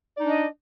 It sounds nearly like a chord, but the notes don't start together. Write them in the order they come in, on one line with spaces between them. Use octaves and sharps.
D5 D#4 D4 D#5